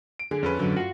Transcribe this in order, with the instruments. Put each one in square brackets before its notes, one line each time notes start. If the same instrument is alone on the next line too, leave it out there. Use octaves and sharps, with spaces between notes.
[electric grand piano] D7
[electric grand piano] D3 [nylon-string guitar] G#4
[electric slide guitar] F2 [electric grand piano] C#4 A4 B4
[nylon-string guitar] F2 G#2 F#3 [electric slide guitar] D3
[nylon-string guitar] G2 F4 F5 [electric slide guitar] F#4